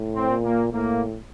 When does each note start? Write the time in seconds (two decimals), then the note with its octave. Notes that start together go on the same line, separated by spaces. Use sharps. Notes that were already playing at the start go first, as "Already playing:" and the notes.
Already playing: A2
0.16 C4
0.30 A#2
0.45 A#3
0.73 A2 A#3